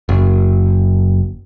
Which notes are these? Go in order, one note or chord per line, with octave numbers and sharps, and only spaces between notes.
F#1